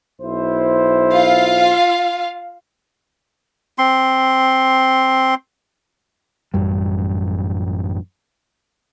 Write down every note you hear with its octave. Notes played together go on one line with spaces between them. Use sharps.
B1 E4 C5
F4 F5
C4 C6
A1 F#2 G3